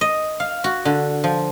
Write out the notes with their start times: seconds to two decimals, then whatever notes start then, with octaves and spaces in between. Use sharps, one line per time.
0.01 D#5
0.40 F5
0.64 F#4
0.85 D3
1.24 F3